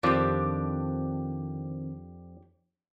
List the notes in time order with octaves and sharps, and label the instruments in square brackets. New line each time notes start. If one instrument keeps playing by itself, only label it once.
[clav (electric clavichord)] F2 F3 C5 [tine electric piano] D#3 C4 [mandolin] D4 G4